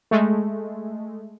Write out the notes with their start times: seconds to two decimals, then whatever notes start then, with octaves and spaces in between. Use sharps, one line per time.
0.11 G#3 A3